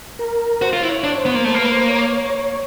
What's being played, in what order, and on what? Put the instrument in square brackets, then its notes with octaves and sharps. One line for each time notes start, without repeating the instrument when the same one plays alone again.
[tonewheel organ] A#4
[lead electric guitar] F#4 [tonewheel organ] C5
[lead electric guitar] F4
[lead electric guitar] E4 [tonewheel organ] C5
[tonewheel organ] C#5
[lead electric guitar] D4
[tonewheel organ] C5
[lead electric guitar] B3
A#3
[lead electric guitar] A3 [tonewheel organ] C5
[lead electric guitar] A#3 [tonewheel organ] B4
[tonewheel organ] C5
C#5
C#5